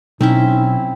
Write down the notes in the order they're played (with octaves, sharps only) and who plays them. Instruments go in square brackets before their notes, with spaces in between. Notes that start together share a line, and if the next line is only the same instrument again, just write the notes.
[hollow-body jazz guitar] B1 [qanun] C4 C#4 E4 [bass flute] D#4